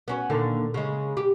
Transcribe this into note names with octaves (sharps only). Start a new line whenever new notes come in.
B3 C#4 F#4
D#2 A#2 D3
C#3 G#3
G4